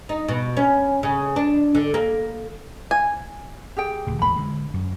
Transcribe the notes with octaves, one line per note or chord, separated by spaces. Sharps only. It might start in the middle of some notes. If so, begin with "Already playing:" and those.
D#4
B2
C#4
C#3
D4
D3
A#3
G#5
G4 G#4 G5
D#1 D2
A1 E2 G#3 B5
D3 G#3
F#2